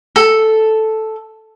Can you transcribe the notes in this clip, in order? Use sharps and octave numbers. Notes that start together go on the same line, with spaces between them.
A4